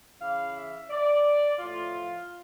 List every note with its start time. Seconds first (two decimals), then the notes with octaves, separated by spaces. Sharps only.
0.20 C#3 E3 F5
0.55 E5
0.90 D5
1.59 A2 F3 F4